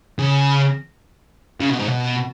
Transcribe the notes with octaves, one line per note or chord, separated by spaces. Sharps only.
C#3
C#3
B2
G#2
B2